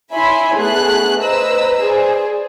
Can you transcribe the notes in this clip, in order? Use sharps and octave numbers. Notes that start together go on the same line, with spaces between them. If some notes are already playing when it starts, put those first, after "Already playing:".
E4 C#5 E5 G#5 B5 C6
A3 B3 G#4 F#6
B4 C5 D#5 A#5 E6
G#4 C5 D5